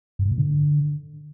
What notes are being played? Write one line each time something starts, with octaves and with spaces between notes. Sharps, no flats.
G2
G#2
A#2
D3